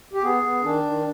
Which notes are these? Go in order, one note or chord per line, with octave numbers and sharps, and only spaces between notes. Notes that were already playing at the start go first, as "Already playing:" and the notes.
G4
B3 G#4
B3
D#3 D4
D#3